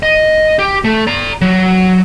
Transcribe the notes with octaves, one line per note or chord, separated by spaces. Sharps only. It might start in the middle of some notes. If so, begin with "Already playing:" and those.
D#5
G4
A3
D5 A#5
F#3